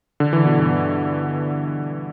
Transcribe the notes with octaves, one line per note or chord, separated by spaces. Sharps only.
D3
E3
B2
G2